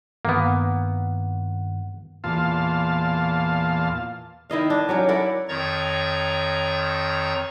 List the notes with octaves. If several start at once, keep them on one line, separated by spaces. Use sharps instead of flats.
G2 D#3 A#3 B3 F#5
E2 A#2 F4 F5 A5
D#3 E4 D#5 F5
D4
F#3 C#4 G4
E4 A#4 D5 F#5
F2 D#3 C#5 A#5 C#6 A6